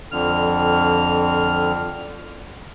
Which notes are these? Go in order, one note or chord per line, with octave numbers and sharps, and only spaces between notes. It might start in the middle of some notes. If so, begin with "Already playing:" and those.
F2 D3 F6